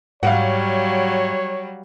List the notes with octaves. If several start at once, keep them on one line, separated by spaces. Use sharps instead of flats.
G#2 F#3 G3 C#5 F5 F#5